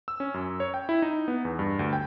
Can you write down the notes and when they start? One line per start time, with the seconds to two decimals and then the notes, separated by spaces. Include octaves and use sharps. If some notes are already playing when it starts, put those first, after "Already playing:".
0.08 E6
0.20 C#4
0.34 F#2
0.60 C#5
0.74 G5
0.89 E4
1.02 D#4
1.28 B3
1.45 E2
1.59 G2
1.79 D2
1.93 G5